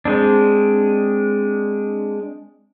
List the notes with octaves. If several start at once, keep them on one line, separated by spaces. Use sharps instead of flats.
G#3 C4 D4